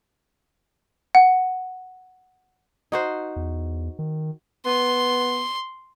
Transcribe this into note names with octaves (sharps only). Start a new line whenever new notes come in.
F#5
D#4 F#4 C5
E2
D#3
B3 C6